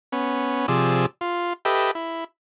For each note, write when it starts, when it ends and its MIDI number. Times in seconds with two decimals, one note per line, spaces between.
0.12 0.66 59
0.12 0.66 61
0.68 1.06 48
0.68 1.06 53
0.68 1.06 68
0.68 1.06 74
0.68 1.06 88
1.21 1.53 65
1.65 1.91 67
1.65 1.91 69
1.65 1.91 71
1.65 1.91 75
1.65 1.91 76
1.65 1.91 79
1.95 2.24 64